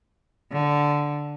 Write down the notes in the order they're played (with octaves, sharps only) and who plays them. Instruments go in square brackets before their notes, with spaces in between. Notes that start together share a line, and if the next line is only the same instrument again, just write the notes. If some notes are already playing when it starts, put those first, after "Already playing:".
[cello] D3